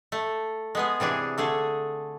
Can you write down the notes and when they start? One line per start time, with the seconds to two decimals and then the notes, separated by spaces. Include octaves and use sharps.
0.12 A3
0.75 G#3 B3 G#4
1.00 C3 E3 D4 G#4
1.38 D3 A3 G#4